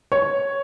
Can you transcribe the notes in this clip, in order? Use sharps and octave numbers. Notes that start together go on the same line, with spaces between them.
C#5